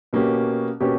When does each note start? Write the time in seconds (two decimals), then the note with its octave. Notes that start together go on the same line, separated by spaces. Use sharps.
0.13 B2 A#3 C#4 G4
0.80 B2 A#3 C#4 G4